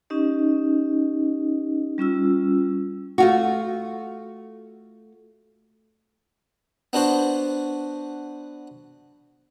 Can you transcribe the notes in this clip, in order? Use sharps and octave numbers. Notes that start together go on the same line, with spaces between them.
C#4 D#4 G4 D#5
G3 C#4 F4 E6
A3 F4 F#4
B3 D4 F#4 C5